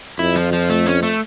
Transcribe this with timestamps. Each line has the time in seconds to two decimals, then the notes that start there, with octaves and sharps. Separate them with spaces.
0.18 F2 E4
0.36 F3
0.53 F3
0.70 A3
0.86 C#4
1.03 A3